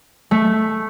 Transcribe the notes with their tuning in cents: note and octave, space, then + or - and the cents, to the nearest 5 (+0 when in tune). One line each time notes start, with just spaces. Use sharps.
A3 -5